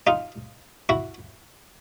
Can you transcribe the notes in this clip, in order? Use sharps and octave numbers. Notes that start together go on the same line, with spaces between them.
D#4 F4
E4 F#4